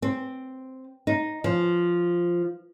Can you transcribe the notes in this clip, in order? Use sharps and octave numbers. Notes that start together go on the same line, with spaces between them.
C4
D#4
F3